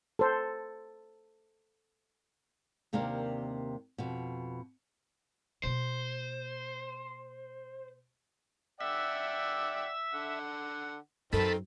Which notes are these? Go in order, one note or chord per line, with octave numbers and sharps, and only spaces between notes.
A4 C5
D#2 C3 A#3 C4 D4 A#4
F2 B2
B2 A#3 C5
D5 E5 F#5 G5
D3 F#5
F#2 D#3 C4 D#4 A4 A5 B5